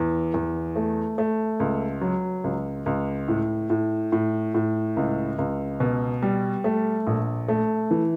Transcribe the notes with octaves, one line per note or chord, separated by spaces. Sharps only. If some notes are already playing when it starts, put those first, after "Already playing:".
Already playing: E2
E2
A3
A3
C#2
F#3
C#2
C#2
A2
A2
A2
A2
C#2
C#2
B2
G3
A3
A#1
A3
E3